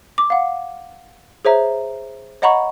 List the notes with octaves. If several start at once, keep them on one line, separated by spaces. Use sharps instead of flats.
D6
F5 F#5
G#4 C5 C#5 E5 A#5
C#5 D#5 F#5 A#5 B5 C#6